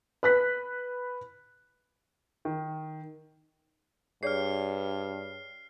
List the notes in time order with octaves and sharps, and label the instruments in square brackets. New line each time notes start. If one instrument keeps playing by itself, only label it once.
[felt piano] B4 F#6 B6
[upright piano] D#3
[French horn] G2 [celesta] G#4 C#5 D5 [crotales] F6 C7